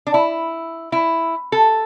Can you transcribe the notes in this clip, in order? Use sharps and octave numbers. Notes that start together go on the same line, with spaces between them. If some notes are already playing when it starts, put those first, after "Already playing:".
D4
E4
E4
A4